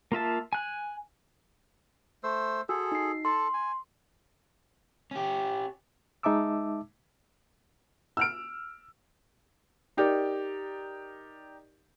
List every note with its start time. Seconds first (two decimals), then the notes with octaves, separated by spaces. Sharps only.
0.12 A#3 F4 E5 A5
0.53 G#5 F#6
2.24 A3 C5 E6
2.69 F#4 G#4 A4 G#5 E6
2.92 D#4 C7
3.25 A4 A5 C6
3.54 G#5
5.11 C#4 G4
6.23 G#3 D#4 E5 A5 D6 E6
8.17 E6 F6 D7
9.97 D#4 G4 A#4 D5